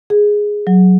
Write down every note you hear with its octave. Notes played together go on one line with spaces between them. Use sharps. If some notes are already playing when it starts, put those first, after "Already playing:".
G#4
F#3